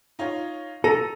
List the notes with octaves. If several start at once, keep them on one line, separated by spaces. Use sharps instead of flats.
D#4 F4 C#5
A4 A#5 A#6 D#7